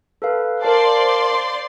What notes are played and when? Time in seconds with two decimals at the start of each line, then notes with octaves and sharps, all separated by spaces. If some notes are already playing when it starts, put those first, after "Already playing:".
0.22 A4 B4 F5
0.62 A#4 C5 D5 F5 A5 C6